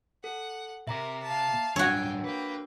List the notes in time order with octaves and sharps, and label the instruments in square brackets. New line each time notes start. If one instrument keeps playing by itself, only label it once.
[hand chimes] A4 [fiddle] F#5
[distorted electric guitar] C3 [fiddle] A#4 [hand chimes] E5 A#5 D6
[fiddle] F5 A5
[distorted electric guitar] G2 F#3 [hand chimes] D4 E6 [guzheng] F#4 C#5 [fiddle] G5 G#5
[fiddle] A#3 G5 [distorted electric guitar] B4